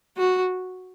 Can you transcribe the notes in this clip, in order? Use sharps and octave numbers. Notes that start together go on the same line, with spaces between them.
F#4